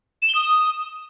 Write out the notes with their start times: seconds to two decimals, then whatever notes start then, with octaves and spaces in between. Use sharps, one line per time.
0.22 E7
0.29 G7
0.35 D#6